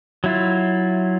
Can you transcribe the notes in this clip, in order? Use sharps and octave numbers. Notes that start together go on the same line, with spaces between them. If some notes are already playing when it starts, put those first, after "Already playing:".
F#3 E4 F4